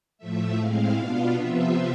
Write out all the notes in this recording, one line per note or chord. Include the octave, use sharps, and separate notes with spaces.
A2 F3 A3 E5
A2 G#3 C4 E4 F5
B2 B3 D4 F4 F5
C3 F3 B3 F4 E5